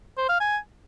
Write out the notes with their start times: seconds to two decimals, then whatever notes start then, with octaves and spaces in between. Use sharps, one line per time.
0.18 C5
0.29 F5
0.41 G#5